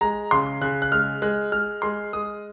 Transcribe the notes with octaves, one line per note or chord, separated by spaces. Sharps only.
G#3 A#5
C#3 C6
C#3 F#6
F#6
G#3 F6
G#3 F#6
G#3 F6
G#3 C6
G#3 D#6